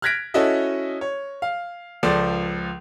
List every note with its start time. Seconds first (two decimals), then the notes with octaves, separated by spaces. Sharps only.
0.02 F6 F#6 G#6 A#6 B6 D7
0.34 C#4 E4 F#4 A4 D#5 E5
1.01 C#5
1.42 F5
2.03 C#2 F3 A4 D5